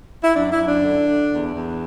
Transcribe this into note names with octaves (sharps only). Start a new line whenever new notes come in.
E4
F#2 D4
E4
F#2
D4
D3
D3
E2
E2